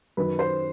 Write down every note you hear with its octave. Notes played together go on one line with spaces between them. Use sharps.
F#2 D#3 F#3 B4
C5